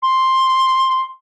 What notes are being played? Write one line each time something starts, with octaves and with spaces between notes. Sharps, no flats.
C6